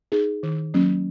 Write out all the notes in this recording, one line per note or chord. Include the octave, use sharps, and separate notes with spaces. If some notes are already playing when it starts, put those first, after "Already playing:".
D#4 G#4
D#3
F#3 A#3 C#4